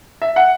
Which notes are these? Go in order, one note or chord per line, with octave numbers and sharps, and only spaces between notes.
E5
F#5